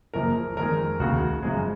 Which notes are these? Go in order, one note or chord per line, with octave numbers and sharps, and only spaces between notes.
F#1 F#2 F3 A#3 A#4
F2 D#3 G#3 A#4
F1 D#2 C#3 F#4
F#2 C#3 F3 G#3